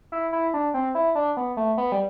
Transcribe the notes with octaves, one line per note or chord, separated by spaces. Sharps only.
E4
E4
D4
C4
E4
D4
B3
A3
B3
G3